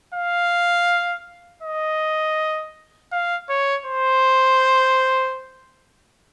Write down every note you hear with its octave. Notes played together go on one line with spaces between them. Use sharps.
F5
D#5
F5
C#5
C5